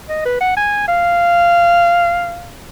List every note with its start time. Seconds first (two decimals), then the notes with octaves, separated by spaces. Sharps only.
0.09 D#5
0.25 B4
0.41 F#5
0.57 G#5
0.88 F5